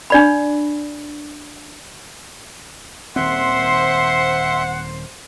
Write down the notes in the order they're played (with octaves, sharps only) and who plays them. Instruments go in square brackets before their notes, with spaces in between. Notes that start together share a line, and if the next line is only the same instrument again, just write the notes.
[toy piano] D4 D5 B5
[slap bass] D#1 D#3 C4 [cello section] C5 [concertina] E5 C6 [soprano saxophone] F#5